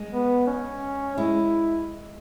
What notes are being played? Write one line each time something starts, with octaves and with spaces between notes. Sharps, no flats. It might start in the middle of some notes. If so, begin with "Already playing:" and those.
Already playing: G#3
B3
C#4
G#3 E4